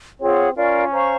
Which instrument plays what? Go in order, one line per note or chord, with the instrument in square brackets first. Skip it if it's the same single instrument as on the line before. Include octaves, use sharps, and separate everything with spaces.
[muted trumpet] C4 [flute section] F4 G#4 C#5 F#5
[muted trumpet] C#4 [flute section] F4 A#4 D5 F5
[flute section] C5 F5 A#5 C#6